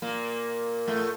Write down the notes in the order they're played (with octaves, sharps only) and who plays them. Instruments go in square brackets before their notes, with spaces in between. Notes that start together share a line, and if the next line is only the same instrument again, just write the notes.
[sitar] A#2 A#3
A2 A3